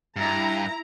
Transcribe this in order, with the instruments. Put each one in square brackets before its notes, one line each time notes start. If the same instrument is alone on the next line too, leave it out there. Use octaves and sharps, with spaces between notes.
[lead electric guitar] G2 [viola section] E4 A#5